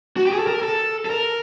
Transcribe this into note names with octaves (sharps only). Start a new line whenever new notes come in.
F#4
G4
G#4
A4
A#4
A4
A4
A#4